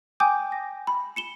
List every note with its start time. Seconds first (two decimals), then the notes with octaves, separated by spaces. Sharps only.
0.20 G5 G#5 D6 D#6 G6
0.52 A#6
0.87 B5
1.16 C#7 E7 G7